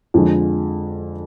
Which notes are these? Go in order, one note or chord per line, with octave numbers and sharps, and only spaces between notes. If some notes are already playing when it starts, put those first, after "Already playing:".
F2 D3 F3 G#3